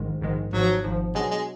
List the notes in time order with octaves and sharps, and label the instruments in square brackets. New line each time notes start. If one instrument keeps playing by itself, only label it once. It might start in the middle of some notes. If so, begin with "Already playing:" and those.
Already playing: [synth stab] A#1 G#2 D#3 G#3
A#1 G#2 D#3 G#3
[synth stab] G#1 G#2 F3 [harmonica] F#3
[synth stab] G#1 G#2 F3
[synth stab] B2 F#3 B3 D4 [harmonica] G#3
[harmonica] G#3